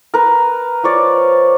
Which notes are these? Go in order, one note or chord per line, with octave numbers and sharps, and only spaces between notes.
A#4 B4
F3 C#5 D5